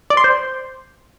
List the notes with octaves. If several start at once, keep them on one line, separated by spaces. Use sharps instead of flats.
D5
C6
C5